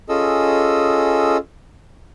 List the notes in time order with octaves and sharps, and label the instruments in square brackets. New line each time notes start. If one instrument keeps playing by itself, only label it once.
[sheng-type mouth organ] C#4 F4 G#4 A4 D#5 E6